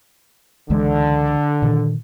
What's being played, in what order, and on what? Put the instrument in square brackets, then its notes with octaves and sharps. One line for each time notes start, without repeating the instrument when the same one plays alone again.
[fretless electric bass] C#2 E3 G#3 [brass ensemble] D3
[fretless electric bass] A#2 D#3